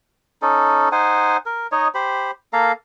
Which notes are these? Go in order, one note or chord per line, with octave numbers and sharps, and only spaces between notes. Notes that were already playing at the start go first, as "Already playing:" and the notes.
C#4 D#4 A4
D#4 C5 F#5 G#5
A#4
D#4 C#5 D#5
G4 C5 B5
A#3 A4 F5 A#5